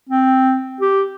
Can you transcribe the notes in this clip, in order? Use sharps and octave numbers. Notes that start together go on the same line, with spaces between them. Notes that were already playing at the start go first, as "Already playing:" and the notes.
C4
G4